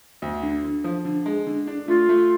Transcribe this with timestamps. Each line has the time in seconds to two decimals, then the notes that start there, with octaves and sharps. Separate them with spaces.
0.22 D2
0.43 D3
0.64 D3
0.84 F3
1.05 D3
1.26 G#3
1.47 D3
1.67 D4
1.88 A3 F4
2.09 A3